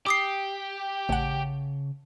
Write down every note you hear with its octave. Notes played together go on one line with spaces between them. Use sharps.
G4 D6 D#6 C7
A1 C#3 C#5 F#5 A5